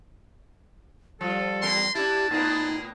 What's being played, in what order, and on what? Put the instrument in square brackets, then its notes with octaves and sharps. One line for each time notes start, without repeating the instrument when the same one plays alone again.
[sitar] F3 F4 [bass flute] G3 [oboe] A4
[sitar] E2 A#3 A#4 [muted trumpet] C6
[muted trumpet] A#3 [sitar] D4 E4 [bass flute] G4 [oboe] A5
[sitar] A2 A#3 B3 [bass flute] D#4 [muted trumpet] G#4